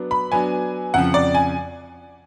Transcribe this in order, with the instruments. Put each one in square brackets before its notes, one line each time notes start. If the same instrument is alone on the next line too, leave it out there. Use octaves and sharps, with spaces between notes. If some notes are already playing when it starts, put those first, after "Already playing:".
Already playing: [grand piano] F#3 B3 D4
[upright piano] B5
[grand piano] F#3 B3 D4 [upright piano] G#5
[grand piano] F2 C#3 F3 [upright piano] F#5
[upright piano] D5
G#5